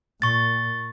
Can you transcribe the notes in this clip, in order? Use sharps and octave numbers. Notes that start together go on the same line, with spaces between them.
A#2 C#6 A6